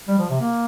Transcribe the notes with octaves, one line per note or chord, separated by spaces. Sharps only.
G3
F3
C3
A#3